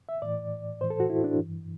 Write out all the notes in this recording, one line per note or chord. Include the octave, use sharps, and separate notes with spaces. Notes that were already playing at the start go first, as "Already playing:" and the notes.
E5
A2 E3 D5
A2 E3 C5
A4
F#4
E4
D4
G2 E3